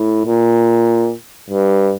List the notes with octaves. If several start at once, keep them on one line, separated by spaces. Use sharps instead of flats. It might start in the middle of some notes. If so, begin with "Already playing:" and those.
Already playing: A2
A#2
G2